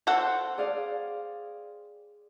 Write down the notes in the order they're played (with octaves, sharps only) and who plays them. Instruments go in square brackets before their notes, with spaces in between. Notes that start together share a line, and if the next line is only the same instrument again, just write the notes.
[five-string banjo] C4 A4 F#5
[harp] G#4 D5 F5